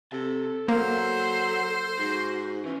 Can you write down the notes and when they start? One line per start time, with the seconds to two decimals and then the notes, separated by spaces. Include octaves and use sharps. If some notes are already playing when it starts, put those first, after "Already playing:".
0.12 C3 A4 A5
0.68 F#3 A#3 A4 C5
1.99 G#2 F#4
2.65 C2 E3 C#4